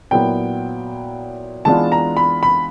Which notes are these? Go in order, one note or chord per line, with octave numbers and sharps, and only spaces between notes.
A#2 F#3 B3 E4 G5
E3 G#3 B3 D4 F4 A5
A#5
B5
B5